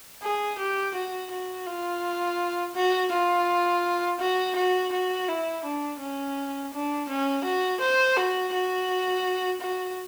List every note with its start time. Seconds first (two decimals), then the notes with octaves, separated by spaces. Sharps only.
0.22 G#4
0.59 G4
0.95 F#4
1.31 F#4
1.67 F4
2.75 F#4
3.12 F4
4.20 F#4
4.56 F#4
4.93 F#4
5.28 E4
5.64 D4
6.00 C#4
6.73 D4
7.09 C#4
7.44 F#4
7.81 C5
8.17 F#4
8.53 F#4
9.61 F#4